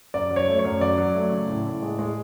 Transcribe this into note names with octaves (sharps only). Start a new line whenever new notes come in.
F#2 D5
F#3
C#5
A3
C#5
F#2
F#3 D5
F#3
A3
C#3
A2
A2
G#3
G#3